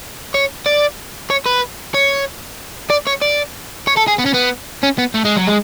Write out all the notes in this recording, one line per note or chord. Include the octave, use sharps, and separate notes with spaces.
C#5
D5
C#5
B4
C#5
D5
C#5
D5
C#5
A4
G#4
B3
C#4
B3
C#4
B3
A3
G#3
F#3
G#3